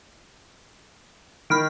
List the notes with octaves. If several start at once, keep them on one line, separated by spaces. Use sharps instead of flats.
D#3 B5 F6 D7